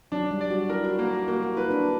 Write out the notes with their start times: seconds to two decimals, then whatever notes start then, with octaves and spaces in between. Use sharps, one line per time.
0.12 F#3 D4
0.31 G3
0.41 D5
0.50 F#4
0.69 E4 A#4
0.84 F#4
0.99 A#3 F#4
1.13 F#4
1.28 A#3 F#4
1.42 F#4
1.56 E4 B4
1.71 D4